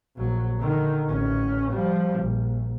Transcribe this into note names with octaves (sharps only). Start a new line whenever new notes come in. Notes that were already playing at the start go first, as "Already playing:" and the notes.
A#1 F#3
D3 D#3
A1 C#4
F3 G3
A#1